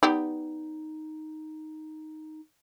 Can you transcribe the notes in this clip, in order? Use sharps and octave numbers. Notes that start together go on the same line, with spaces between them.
B3 D#4 G4 D5